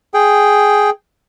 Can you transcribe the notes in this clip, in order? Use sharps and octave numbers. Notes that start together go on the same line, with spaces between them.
G#4 G5